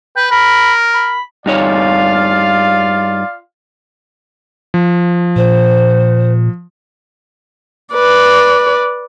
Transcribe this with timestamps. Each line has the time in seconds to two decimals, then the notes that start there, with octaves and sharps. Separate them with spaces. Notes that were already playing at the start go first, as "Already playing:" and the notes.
0.16 B4 G5
0.31 A#4 B5
0.95 B5
1.46 G2 D#4 F4 C#5 D5 F5
4.74 F3
5.36 A#2 C5
7.95 B4 D5